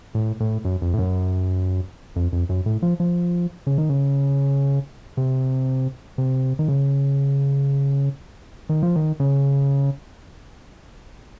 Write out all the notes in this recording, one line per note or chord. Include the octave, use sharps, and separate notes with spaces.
A2
A2
F#2
F2
A2
F#2
F2
F2
F#2
A2
F3
F3
C#3
D#3
C#3
C3
C3
D#3
C#3
D#3
F3
D#3
C#3